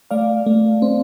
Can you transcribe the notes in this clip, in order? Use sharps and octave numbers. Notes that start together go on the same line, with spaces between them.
A3 D5 F5
A3
C4